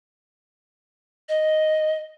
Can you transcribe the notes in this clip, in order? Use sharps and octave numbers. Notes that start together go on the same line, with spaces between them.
D#5